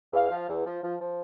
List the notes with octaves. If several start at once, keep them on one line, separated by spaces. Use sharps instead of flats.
E2 F5
F5
F3
F5
E2
F3
F3
F3